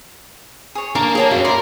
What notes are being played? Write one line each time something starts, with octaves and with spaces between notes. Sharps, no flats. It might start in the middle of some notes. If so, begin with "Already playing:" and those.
G#4 C#5
A#3 D4 A#4
G#4 C#5 F5 G5 A5 A#5
F#2 F#3 G3
A#4 D5 B5 C6